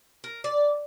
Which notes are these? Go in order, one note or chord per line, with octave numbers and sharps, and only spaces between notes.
A#4
D5